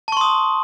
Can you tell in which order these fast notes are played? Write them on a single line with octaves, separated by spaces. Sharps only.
A5 C#6 C6 D#6